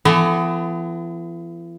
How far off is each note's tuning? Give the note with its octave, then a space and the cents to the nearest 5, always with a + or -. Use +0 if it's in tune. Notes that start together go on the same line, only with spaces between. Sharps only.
E3 +45 B3 +35 A4 +0